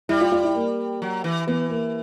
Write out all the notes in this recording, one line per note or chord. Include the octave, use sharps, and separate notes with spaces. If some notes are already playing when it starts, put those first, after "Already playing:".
G3 E4
F4
F4
E4
A#3
F#3
E3
E3 B3
A#3